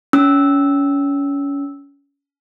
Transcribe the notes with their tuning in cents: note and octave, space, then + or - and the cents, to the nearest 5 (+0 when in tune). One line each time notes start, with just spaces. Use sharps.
C#4 +25 E6 -10